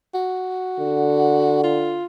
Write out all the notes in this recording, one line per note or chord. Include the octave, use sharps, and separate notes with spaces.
F#4
D3
F4